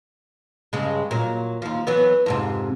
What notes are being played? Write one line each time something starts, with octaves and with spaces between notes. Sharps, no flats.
G2 C#3 G#3
A#2 F#3
D#2 F3
E3 F#3 B3
F2 G#2 C3